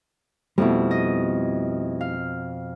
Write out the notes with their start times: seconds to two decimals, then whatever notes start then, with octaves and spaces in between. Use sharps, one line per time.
0.58 F2 B2 G3 A3 E4
0.91 D#5
2.01 F5